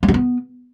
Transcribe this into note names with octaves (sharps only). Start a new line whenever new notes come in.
A3
G3
B3